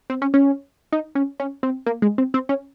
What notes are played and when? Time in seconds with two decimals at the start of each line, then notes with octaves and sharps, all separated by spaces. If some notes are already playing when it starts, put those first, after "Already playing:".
0.10 C4
0.22 C#4
0.34 C#4
0.93 D#4
1.15 C#4
1.40 C#4
1.63 C4
1.86 A#3
2.02 G#3
2.18 C4
2.34 C4
2.49 C#4